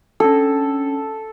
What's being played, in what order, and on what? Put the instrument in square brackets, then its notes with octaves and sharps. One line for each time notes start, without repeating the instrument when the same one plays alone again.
[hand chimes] C#4 D4 [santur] A4